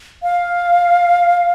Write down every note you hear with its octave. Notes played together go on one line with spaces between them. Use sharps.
F5